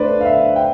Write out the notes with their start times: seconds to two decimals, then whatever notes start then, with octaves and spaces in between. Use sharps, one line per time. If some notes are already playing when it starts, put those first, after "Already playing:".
Already playing: D3 A3 D4 B4 C5 D5
0.21 F5
0.25 D3 E5
0.56 G5